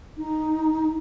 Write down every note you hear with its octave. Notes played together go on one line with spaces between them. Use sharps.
D#4